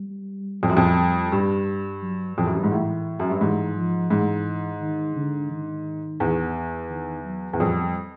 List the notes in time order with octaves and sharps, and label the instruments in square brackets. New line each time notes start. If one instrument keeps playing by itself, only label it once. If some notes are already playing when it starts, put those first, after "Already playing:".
Already playing: [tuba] G3
[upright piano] F2 [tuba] G3
[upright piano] F#2
F2
G2
[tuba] F#3
[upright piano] F2 [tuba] E3
[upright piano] F#2
G2
G#2
A2
F#2
G2
[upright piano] G#2 [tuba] E3
[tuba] F3
[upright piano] G#2 [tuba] E3
[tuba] D#3
D3
D#3
[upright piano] E2
[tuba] D#3
F#3
[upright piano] E2
[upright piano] F2 [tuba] G3